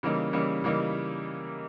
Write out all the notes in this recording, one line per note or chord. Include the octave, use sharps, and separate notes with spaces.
C#3 E3 G3 A#3 D#4
C#3 E3 G3 A#3 D#4
C#3 E3 G3 A#3 D#4